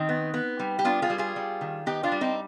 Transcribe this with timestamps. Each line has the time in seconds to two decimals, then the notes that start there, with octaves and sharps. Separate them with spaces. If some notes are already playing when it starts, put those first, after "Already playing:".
Already playing: D#3 C4 D#4
0.09 B3
0.34 B3
0.59 G3
0.79 G4
0.84 B3 D4 F4
1.02 F4 G#4
1.10 G3
1.18 F4 G#4
1.36 G3
1.61 D#3
1.86 B3 D#4 G4
2.03 D4 F4
2.12 G3
2.21 C4 D#4